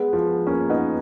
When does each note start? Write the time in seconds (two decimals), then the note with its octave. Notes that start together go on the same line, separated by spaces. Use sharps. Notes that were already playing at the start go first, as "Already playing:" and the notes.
Already playing: G#3 B3
0.13 F3
0.47 A#3 C#4
0.69 B3 D#4